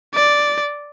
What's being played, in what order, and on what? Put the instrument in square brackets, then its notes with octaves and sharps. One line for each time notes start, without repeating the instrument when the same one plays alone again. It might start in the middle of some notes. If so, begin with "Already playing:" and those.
[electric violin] D5